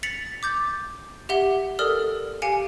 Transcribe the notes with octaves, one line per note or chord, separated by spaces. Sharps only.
A6 B6 C#7 F7 F#7
D6 G6 A6
G4 E5 F#5 G7
A4 A#4 D5 D#6 F6
G4 F5 G#5 C#7 D7